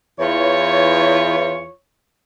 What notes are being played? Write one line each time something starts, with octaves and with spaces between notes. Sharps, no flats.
E2 E3 F4 C#5